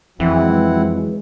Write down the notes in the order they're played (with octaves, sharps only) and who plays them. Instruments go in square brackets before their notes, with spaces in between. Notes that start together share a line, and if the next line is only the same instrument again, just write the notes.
[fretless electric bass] F2 [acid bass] E3 [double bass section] F#3 G#3 [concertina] C4 E4 F#5